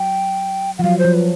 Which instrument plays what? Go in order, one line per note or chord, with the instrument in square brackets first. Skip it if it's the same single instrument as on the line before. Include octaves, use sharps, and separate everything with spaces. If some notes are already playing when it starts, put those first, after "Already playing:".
Already playing: [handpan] F#3 [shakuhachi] G5
[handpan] F3 [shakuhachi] F#5
[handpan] F#3 [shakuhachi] F5
[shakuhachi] C5
[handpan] F3
[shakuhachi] B4